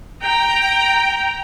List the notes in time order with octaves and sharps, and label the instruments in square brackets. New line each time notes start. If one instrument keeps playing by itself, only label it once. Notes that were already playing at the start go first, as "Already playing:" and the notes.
[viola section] G5 A#5